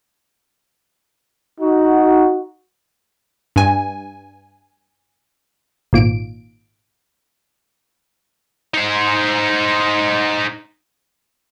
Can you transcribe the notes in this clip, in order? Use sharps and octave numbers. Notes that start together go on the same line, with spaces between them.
D#4 F#4
G2 G#5
G#1 A#2 D7
D#4 C5